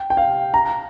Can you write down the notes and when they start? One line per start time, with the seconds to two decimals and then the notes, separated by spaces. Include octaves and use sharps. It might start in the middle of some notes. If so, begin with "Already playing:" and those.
Already playing: G5
0.10 G5
0.17 F5
0.54 A#5